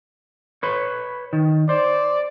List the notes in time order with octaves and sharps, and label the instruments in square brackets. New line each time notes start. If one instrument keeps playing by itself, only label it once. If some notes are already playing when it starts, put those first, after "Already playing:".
[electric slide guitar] B4 C#5
D#3
[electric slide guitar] C5 [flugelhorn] D5